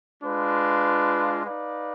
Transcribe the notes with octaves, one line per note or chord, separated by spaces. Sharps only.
G#3 D4 F4 B4
D#4 B4 D5 F5